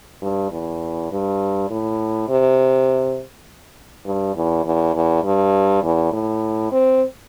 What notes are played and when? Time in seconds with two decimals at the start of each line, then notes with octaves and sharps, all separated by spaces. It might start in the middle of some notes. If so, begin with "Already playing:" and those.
0.22 G2
0.52 E2
1.11 G2
1.70 A2
2.29 C3
4.05 G2
4.36 E2
4.65 E2
4.94 E2
5.24 G2
5.83 E2
6.13 A2
6.72 C4